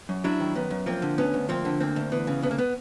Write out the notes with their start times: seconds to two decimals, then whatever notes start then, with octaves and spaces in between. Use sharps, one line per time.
0.09 F#2
0.24 F#3 D4 E4
0.40 D#3
0.55 F#2 B3
0.70 F#2
0.86 F3 A#3 C4
1.02 D3
1.18 D2 B3 C#4
1.34 D2
1.49 F3 A#3 C4
1.65 D3
1.80 D2 A#3 C4
1.96 D2
2.12 E3 B3
2.27 C#3
2.42 D2 B3
2.51 A#3
2.58 B3